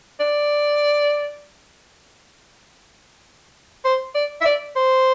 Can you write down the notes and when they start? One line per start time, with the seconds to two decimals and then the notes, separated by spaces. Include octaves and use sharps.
0.20 D5
3.85 C5
4.15 D5
4.41 E5
4.45 D5
4.76 C5